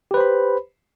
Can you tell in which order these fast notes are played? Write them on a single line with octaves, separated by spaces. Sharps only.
G4 B4 C5 B5